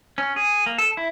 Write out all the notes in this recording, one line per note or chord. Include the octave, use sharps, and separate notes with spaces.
C#4
G#4
A#3
A4
E4